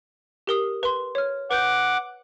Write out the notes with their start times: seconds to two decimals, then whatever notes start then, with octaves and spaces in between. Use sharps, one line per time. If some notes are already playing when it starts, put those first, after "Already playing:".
0.47 G4 A#4 D#6
0.83 B4 C6
1.15 C#5 F6
1.51 B4 F#5 D6 G6